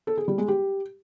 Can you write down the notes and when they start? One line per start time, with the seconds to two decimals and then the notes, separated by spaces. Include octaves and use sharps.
0.07 A4
0.17 G#4
0.28 G3
0.38 G#3
0.48 G4